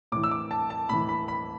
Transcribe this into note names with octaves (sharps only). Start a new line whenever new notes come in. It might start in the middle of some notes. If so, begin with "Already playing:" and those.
A2 E3 D6
E6
D6
A5
A5
A2 E3 B5
B5
B5